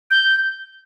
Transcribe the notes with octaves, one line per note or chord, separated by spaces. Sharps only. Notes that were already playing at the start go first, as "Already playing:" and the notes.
G6